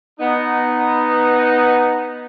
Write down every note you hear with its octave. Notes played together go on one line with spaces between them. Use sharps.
B3 D#4